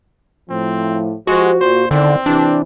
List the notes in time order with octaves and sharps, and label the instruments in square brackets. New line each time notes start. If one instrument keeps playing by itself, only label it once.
[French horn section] A2 F3 [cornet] C4
[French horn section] F3 G4 C5 [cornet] G#3 [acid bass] F#4
[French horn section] A#2 [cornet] C5
[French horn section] E2 D#3 D5 [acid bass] D3 [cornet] C4
[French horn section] C3 E3 [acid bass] D4